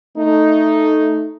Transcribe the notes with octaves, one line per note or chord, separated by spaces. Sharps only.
A3 D#4